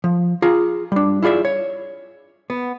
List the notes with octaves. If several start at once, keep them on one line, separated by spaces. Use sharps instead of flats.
F3
F4 G#4 A#5
G3 D4
E4 F4 G#4 D5 E5
C#5
B3